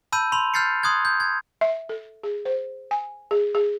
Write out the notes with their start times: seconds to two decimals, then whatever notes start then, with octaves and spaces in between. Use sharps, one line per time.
0.12 A5 B5 E6 G6 D#7
0.32 B5 C6 F7
0.54 F6 G6 A6 C7 C#7
0.83 C6 D#6 F#6 G#6
1.05 G6
1.20 G#6
1.61 E5
1.89 A4
2.23 G#4
2.45 C5
2.91 G#5
3.31 G#4
3.55 G#4